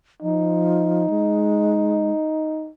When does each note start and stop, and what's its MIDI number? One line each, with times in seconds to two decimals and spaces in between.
0.22 1.10 53
0.22 2.70 63
1.10 2.11 56